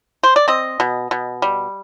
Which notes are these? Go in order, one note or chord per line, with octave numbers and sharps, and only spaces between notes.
C5
D5
C4 D#5
B2
B2
G3